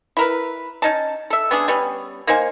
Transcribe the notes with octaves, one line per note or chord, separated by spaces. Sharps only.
E4 A#4 B4
C#4 D#4 A5
A4 E5
B3 C#4 D4 G#4
G3 B3 C#4
A#3 D#4 C5 G#5